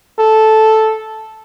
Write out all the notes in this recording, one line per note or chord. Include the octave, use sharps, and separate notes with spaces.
A4